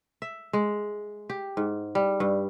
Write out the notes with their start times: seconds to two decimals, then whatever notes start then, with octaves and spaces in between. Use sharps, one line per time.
0.22 E5
0.53 G#3
1.30 G4
1.57 G#2
1.95 G3
2.20 G2